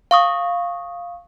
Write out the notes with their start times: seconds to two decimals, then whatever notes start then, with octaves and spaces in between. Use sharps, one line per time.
0.11 F5 C#6 D#6